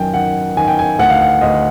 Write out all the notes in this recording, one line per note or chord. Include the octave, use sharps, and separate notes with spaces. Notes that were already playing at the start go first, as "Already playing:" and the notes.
Already playing: F#2 D#3 G5 G#5
D#3 F#5
D#3 G#5
G5
G#5
D2 F#5
F5
F#5
D2 D#5